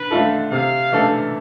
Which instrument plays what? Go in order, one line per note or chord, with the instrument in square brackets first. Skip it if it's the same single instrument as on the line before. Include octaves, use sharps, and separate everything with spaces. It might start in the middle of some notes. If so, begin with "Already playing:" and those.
Already playing: [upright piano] D3 [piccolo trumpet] B4
[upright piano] A3 D4 F4 A4
[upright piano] C3 [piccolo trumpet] F5
[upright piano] E3 A3 D4 A4